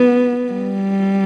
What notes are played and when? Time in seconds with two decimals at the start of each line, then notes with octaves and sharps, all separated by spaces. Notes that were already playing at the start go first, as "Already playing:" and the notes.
Already playing: B3
0.52 G3